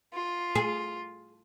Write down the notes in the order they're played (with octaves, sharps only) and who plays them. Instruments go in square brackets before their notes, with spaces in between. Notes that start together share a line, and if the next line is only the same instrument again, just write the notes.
[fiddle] F4
[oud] G#4